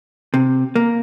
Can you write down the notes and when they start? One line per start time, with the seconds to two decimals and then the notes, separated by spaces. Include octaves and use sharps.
0.34 C3
0.75 A#3